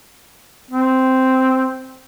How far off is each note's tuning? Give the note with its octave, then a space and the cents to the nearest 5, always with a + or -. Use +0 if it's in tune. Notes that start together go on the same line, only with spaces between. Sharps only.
C4 -5